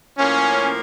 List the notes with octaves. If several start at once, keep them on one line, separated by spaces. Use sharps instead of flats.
A2 F3 A#3 C#4